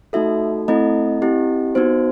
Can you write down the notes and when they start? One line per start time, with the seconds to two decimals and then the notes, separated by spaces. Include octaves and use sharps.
0.13 A3 D#4 F#4 A4 E5
0.68 A3 C4 E4 A4 D#5
1.22 C4 E4 G4
1.75 B3 D#4 F#4 C5